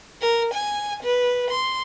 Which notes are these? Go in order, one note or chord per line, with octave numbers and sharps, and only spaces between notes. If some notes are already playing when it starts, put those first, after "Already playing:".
A#4
G#5
B4
C6